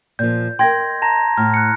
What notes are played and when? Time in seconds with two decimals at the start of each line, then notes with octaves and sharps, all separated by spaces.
0.19 A#2 F3 G6
0.59 A#4 D#5 G5 C6 G#6 A#6
1.02 A5 A#5 A#6
1.38 A2 F6
1.54 F#6 C#7